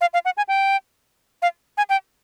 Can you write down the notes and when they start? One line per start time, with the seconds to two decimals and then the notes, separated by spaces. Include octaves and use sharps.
0.01 F5
0.14 F5
0.25 F#5
0.37 G#5
0.48 G5
1.42 F5
1.78 G#5
1.89 G5